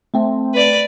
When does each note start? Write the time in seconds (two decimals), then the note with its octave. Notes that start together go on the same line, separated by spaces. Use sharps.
0.14 A3 C4
0.54 B4 D5